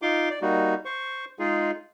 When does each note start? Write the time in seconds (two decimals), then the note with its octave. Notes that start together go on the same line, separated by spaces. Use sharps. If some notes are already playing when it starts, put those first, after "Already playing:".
0.02 D#4 F4 C6 D6
0.30 D5
0.42 G3 A#3 D#4 F#4
0.85 C5 C#6
1.39 G#3 D#4 F4 G#4